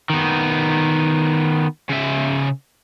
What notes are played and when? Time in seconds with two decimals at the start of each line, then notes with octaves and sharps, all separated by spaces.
0.10 D#3 B3
1.90 C#3 E5